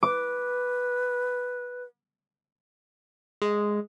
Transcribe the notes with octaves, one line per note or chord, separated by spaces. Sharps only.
B4 D6
G#3